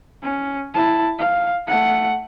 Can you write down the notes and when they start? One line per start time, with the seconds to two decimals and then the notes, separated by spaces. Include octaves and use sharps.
0.22 C#4
0.74 E4 A5
1.18 F5
1.67 A3 F#5